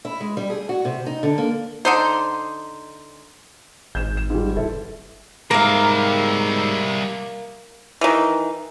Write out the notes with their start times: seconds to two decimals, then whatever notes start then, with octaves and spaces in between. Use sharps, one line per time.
0.05 E4
0.20 G#3
0.37 G3
0.50 G#4
0.69 F#4
0.85 C3
1.06 D#4
1.23 D3
1.38 A#3
1.85 D3 D#4 C5
3.95 G#1 G6 E7
4.17 E7
4.30 G#2 G3
4.56 F#1 E4 A4
5.51 G#2 G3 A#3 A#4 E5 F5
8.01 D#3 E3